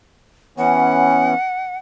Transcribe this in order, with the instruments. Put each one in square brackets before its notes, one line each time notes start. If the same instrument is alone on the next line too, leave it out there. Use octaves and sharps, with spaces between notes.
[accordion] E3 B3 C#4 [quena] F#5